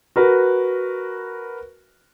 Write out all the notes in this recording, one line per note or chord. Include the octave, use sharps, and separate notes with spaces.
F#4 A#4 B4